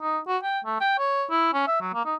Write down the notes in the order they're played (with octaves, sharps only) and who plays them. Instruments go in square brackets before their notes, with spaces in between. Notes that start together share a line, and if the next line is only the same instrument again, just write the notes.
[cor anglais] D#4
F#4
G5
A3
G5
C#5
E4
C#4
E5
F#3
A#3
D#4